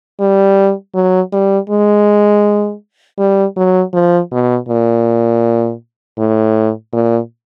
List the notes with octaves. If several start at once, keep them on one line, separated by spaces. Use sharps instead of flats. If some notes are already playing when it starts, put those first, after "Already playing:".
G3
F#3
G3
G#3
G3
F#3
F3
B2
A#2
A2
A#2